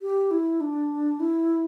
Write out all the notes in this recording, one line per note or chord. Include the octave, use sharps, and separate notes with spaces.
G4
E4
D4
E4